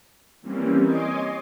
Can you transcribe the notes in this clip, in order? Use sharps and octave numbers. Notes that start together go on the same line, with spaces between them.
E3 G3 A#3 C4 C#4
C#5 D#5 G#5 C6 D6 D#6